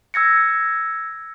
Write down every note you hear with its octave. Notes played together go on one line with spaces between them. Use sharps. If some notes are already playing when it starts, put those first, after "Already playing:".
E6 G#6 A#6 C#7